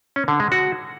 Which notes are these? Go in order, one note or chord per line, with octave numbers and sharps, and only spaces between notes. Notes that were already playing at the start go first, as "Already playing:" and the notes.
C#4
D3
G#3
F#4